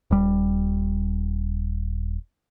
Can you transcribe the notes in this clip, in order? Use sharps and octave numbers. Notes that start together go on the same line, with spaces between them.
D#1 G3